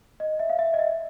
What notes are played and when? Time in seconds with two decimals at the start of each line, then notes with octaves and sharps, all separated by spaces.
0.20 D#5
0.39 E5
0.49 F5
0.59 E5
0.74 D#5
0.79 E5